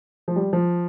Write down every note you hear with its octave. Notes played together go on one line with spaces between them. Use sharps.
F3
G3
F3